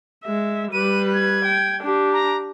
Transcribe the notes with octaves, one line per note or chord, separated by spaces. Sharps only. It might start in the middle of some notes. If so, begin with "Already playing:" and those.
G#3 E5
G3 B4 D#7
G#6
G5
D4 G4
A#5